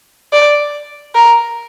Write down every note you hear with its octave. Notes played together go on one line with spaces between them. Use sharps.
D5
A#4